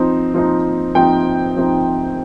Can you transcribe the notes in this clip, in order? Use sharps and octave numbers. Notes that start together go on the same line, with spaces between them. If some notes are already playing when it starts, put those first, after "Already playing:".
Already playing: F3 C4 D#4
F3 C4 D#4
F3 C4 D#4 G5
F3 C4 D#4